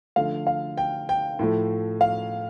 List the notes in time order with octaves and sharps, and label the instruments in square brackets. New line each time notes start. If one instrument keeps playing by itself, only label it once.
[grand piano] D3 F3 A3 F5
F5
G5
G5
A2 F3 A3
F5